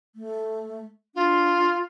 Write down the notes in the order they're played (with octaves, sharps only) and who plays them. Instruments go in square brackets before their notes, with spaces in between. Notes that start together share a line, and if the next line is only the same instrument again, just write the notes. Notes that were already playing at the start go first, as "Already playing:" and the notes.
[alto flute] A3
[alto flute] D4 [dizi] F4